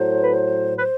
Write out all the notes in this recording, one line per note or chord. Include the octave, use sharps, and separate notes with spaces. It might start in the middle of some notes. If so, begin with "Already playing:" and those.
Already playing: A2 F#3 C5
B4
C5
B4
C5